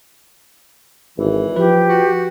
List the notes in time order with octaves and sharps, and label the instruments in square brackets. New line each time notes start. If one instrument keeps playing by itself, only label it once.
[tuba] G#1 [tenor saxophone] E3
[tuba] F3 [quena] G4 [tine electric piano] B4
[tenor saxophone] F#4